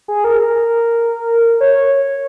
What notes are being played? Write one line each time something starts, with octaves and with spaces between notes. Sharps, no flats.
G#4
A#4
A#4
C#5